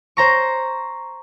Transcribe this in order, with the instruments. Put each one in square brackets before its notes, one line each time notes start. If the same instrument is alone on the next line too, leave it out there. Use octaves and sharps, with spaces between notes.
[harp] C5 A#5 C#6